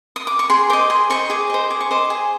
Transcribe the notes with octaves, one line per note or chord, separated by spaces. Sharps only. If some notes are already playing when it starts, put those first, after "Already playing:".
D#6
D6
C#6
G#4 C6
C5 D#5 D6
G#4 C6
C5 D#5 C#6
G#4 D6
C5 D#5
G#4 D6
C#6
C5 D#5 D6
G#4